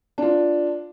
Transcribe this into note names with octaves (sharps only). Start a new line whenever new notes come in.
D4 F4